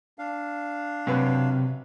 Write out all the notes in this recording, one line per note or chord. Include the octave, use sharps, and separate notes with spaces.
D4 F5
F#2 C3 B4